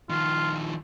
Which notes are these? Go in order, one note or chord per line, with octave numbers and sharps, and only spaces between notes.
D#3 F3 F4